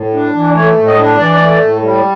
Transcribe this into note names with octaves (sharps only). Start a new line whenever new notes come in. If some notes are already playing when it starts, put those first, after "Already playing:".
Already playing: A2
D4
E3
A3 C#5
A2
D#5
D4
E3 D5
A3
A2
G3